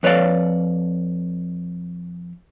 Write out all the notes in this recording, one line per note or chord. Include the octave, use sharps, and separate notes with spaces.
F2 B4 C#5 D5 F5